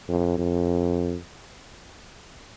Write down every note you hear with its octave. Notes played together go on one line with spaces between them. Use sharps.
F2
F2